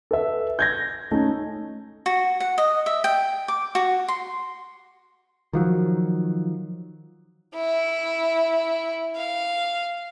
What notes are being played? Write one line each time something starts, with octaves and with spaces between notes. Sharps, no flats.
A4 B4 E5
G6 G#6 A#6
A3 C#4 D#4
F#4
F#5
D#5
E5
G5
D6
F#4
C6
D#3 F3 F#3
E4
F5